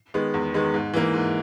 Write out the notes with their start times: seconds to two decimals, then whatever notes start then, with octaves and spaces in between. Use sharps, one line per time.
0.14 D#3 G#3 B3
0.34 E2
0.54 D#3 G#3 B3
0.74 G#2
0.93 E3 A#3
1.14 G#2